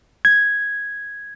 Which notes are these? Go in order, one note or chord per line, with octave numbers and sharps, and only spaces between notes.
G#6